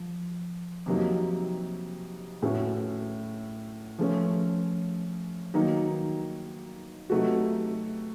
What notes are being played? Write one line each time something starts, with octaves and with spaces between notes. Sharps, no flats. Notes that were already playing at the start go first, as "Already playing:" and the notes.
Already playing: F3
F2 C3 F#3 A#3 D#4
A2 A3 C#4 F#4
F3 A3 C#4
D#3 F#3 A#3 D#4
C3 F#3 A3 D#4 F#4